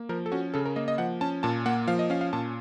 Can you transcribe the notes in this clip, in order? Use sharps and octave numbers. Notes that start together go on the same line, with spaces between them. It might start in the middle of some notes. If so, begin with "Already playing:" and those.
Already playing: A#3
F3 A#4
A4
C#4 F#4
C#3 A4
A#4
A#3 D#5
D#5
F3 F#5
C#4 A5
A#2 A5
A#3 F#5
F3 F5
D#5
C#4 F5
F5
A#2 A5